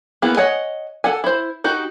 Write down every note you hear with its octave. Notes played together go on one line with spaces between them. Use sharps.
A#3 B3 E4 G#4
C#5 D#5 F#5 G#5
A4 F#5 G#5
E4 C5
D#4 F#4 G4